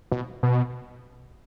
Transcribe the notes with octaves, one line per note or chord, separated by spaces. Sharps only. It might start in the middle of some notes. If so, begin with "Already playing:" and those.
B2
B2